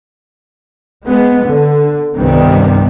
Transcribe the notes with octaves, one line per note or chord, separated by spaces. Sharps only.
G#3 B3
D3
C2 G2 C3 D#3 G3 B3